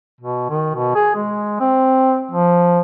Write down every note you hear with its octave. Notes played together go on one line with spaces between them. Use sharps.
B2
D#3
B2
G#4
G#3
C4
F3